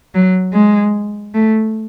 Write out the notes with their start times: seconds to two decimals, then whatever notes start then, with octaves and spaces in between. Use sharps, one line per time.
0.14 F#3
0.53 G#3
1.34 A3